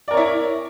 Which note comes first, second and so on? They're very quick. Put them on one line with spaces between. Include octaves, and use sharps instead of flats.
D5 A#4 C#5 E4